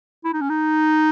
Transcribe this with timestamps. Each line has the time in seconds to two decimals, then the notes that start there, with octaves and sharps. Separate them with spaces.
0.25 E4
0.34 D#4
0.41 C#4
0.50 D#4